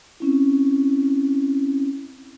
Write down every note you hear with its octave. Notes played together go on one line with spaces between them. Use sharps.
C4 C#4 E4